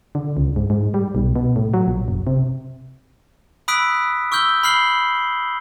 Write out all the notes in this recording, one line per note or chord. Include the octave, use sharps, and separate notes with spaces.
D3
C#2
G#2
G#2
G3
B1
B2
A2
F#3
A#1
F#1
C3
B5 D#6 E6 F#6 B6 D7
C#6 E6 F6 G6 G7
B5 F6 C7 F#7 G7